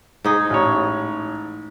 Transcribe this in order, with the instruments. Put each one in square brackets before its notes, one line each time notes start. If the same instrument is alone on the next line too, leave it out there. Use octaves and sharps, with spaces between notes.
[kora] G#2 D#4 G#4
[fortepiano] A1 C#5